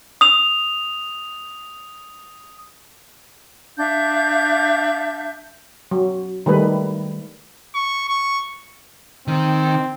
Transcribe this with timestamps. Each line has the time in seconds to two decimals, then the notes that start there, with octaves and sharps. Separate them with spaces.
0.21 D#6 F7
3.77 D4 E5 F5 G6
5.91 F#3
6.46 D#3 G3 A3 B4
7.75 C#6
8.09 C#6
9.28 D#3 C4